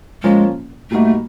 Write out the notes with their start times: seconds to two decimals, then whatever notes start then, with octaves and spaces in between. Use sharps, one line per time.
0.22 A#2 F3 G#3 A#3 C#4 F4
0.90 A#2 G3 A3 A#3 D#4 F#4